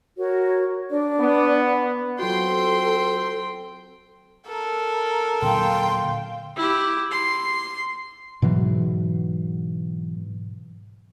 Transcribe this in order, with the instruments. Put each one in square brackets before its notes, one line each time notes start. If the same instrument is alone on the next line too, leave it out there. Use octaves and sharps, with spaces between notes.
[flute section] F#4 A#4 C#5
D4 D5
[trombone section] B3
[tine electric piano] F#3 F4 F#4 [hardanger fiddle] C4 G5 [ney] A4 [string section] C6
[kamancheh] A4 A#4
[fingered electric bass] A#2 D3 F#3 [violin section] F5 G5 [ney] C6
[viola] E4 G4
C6
[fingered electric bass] G#2 B2 E3 F#3